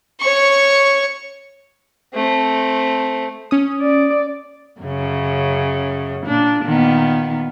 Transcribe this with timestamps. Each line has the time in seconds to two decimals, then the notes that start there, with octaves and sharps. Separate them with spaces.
0.21 C#5 C#6
2.13 A3 C4
3.51 C#4 D#6
3.81 D5
4.81 F#2 C#3
6.25 A#2 D4
6.62 A#2 D#3 B3